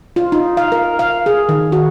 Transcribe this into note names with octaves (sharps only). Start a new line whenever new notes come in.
F4
D#4
F5
A#4
F5
G#4
D#3
F#4